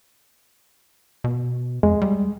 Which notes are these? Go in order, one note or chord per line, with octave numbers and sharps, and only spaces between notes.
B2
F2 G#3
G3